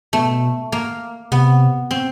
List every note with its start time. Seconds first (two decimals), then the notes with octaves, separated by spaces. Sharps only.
0.13 B2 A3
0.72 A#3
1.32 C3 B3
1.91 C4